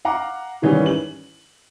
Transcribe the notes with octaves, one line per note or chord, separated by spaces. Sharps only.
F5 F#5 A#5 D6
G#2 D#3 E3 G3 C#4
F#7